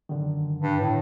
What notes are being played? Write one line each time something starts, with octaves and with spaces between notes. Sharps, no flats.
F#2 D3 D#3
G2
A2